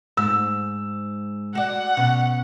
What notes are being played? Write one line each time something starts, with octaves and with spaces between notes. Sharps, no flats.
G#2 E6
F#4 D5 F#5
B2 C#4